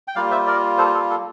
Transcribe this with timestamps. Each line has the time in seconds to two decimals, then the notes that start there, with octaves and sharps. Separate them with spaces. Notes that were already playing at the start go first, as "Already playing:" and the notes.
0.08 G5
0.15 G3 A#3 F4 D5 F5
0.31 C5 E5
0.47 A#4 D5
0.78 A4 C5
0.94 A4
1.10 A4